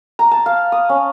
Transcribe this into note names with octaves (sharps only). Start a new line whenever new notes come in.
A#5
A5
F5
D#6
C#4